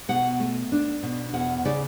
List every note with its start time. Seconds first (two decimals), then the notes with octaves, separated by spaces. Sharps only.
0.09 B2 F#5
0.40 A3
0.72 D4
1.03 B2
1.33 E2 F#5
1.65 C#3 D5